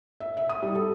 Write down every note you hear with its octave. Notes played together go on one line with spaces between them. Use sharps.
E5
E5
D#6
G3
A4